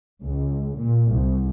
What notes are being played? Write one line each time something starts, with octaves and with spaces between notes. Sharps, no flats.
C#2
A#2
C2